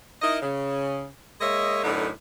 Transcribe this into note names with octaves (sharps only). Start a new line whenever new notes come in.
D#4 E4 A#4 D#5
C#3
G#3 A#3 C#5 D#5 E5
F#2 A2 D3 D#4 B4